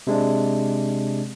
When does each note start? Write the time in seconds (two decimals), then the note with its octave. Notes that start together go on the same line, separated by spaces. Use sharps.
0.07 C3 G#3 D4